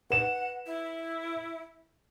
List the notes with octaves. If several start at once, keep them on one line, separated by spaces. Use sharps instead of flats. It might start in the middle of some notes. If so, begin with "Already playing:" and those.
B4 F#5 E7
E4